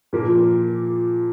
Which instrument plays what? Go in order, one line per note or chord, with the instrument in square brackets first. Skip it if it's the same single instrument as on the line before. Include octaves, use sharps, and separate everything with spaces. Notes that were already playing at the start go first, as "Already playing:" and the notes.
[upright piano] A#2 F3 A#3